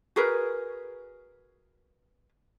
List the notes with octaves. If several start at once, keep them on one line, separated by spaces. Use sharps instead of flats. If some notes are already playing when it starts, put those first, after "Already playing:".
F#4 G#4 A#4 B4